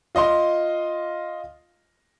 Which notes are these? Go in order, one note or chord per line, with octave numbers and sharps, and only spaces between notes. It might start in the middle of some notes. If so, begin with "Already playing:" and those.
F4 D#5 F5 C6